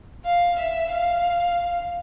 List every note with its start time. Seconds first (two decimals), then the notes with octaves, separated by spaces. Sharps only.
0.25 F5
0.59 E5
0.91 F5